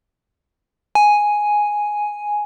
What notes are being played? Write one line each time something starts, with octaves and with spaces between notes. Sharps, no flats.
G#5